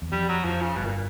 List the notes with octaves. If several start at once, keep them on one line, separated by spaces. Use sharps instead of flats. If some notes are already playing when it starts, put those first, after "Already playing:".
E2
F2 G3
F#3
F2 F3
C#3
G1 G2 B2
A#2